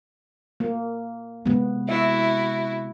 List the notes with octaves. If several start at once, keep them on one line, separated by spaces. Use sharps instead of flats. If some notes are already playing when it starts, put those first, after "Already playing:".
A#3
C3 G#3 B3
E4 F#4 E5